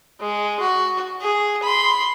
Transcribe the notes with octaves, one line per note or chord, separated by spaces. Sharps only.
G#3
F#4
G#4
B5 C6